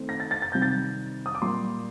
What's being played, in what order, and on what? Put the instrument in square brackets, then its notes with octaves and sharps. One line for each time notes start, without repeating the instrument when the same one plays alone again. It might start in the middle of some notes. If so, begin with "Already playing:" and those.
Already playing: [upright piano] D#3 A3 C4
A#6
A6
A6
A6
C3 D#3 G3 C4 G6
A6
D#6
D6
A#2 G3 A#3 C6